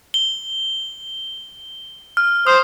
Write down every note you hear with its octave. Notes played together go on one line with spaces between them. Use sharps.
G7
F6
C5 D#6